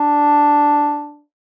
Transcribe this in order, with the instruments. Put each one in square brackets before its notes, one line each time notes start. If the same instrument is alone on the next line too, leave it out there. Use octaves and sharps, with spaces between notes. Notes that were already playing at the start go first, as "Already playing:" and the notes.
Already playing: [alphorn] D4